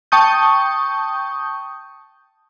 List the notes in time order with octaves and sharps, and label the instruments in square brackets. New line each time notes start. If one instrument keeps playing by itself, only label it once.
[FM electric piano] G5 A5 C#6 D#6 G6